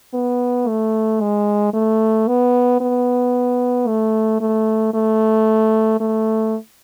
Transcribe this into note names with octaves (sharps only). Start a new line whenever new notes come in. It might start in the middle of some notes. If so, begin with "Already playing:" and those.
B3
A3
G#3
A3
B3
B3
A3
A3
A3
A3